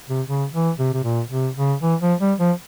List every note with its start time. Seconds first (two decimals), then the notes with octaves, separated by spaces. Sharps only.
0.08 C3
0.27 C#3
0.53 E3
0.79 C3
0.93 C3
1.04 A#2
1.30 C3
1.56 C#3
1.81 E3
2.01 F3
2.20 G3
2.38 F3